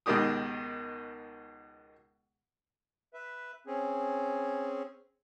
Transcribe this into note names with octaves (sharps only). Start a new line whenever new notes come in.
C#2 B2 D#3 G#3 G4 D#6
B4 E5
C4 C#4 G#4